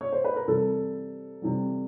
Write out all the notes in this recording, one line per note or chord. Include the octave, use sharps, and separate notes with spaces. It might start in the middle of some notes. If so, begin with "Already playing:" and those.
C#5
C5
B4
A#4
C3 E3 G3 A4
C3 E3 G3